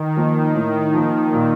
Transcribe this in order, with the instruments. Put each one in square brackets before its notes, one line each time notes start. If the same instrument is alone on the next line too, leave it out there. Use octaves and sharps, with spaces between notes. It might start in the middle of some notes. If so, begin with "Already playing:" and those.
Already playing: [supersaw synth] D#3
[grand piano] F3 A#3
A2
F3 A#3
A#2